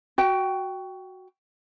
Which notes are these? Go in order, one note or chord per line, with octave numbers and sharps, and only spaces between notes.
F#4 G5